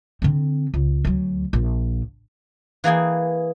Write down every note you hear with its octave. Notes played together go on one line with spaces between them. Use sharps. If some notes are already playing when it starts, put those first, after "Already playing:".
D3 C4
C#2
D2 F#3
A#1
E3 A#3 G#4 G5